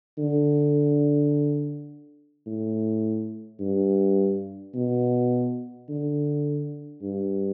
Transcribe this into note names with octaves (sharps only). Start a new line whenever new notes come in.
D3
A2
G2
B2
D3
G2